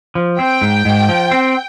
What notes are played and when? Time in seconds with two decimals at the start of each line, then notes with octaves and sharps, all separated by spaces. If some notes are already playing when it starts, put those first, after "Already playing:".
0.15 F3
0.39 C4 G5
0.61 G#2
0.85 G#2
1.09 F3
1.31 C4